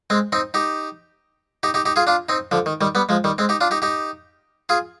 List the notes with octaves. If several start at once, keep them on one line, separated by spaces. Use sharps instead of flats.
G#3 C4
C4 D#4
D#4 G4
D#4 G4
D#4 G4
D#4 G4
F4 G#4
D4 F4
C4 D#4
D3 F3
D#3
D#3 G3
G3 B3
F3 G#3
D#3 G3
G#3 C4
D#4 G4
D4 F4
D#4 G4
D#4 G4
F4 G#4